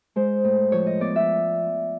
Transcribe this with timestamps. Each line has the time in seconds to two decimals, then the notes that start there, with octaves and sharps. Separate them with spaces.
0.16 G#3 C5
0.44 A2
0.72 F3 C#5
0.87 D#5
1.00 B3 D5
1.16 E5